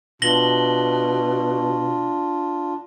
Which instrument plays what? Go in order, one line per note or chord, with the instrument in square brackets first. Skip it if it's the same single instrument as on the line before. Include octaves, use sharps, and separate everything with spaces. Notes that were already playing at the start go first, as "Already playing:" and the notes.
[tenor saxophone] B2 [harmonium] D4 F4 [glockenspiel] A#6 F#7 G7